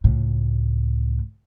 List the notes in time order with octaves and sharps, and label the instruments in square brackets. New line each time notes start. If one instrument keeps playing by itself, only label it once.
[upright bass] C#2 A2